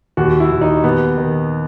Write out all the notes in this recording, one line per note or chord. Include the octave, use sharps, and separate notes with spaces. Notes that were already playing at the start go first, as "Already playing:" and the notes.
D#2 F#4
E4
D#2
D#4
D#2 B3
D#3